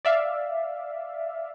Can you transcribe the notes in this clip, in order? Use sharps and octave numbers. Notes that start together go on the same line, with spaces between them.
D5 E5 F5